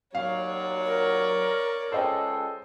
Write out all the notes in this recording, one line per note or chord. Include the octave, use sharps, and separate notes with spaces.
D#2 F#3 C#5 D5 F5
A#4
C#2 G#3 A4 C5 D#5 G5